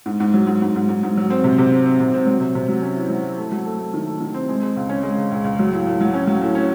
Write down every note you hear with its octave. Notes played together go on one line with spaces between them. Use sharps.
G#2
G#2
F#3
G#2
G#2
G#2
G#2
G#2
F#3
C4
C3
C3
C4
C4
C3
C4
F#3
C3
C3
F#3
C#4
E4
F#3
E4
A3
F#3
A3
A3
D#3
A3
D#3
C4
G#3
G#3
C#2
C#4
G#3
C#2
C#2
C#2
F#3
A2
A2
F#3
C#4
F#3
A2
C#4